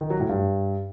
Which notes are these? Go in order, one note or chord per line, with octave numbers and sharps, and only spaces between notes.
D#3
F#3
A2
G2